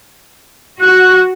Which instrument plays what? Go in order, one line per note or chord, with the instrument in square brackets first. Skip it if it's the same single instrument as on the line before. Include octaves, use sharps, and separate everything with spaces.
[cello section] F#4 [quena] F#6